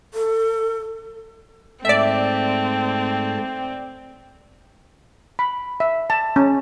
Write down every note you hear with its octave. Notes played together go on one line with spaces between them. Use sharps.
A4
G#2 A3 C4 D5 E5 A5
B5
E5
A5
C#4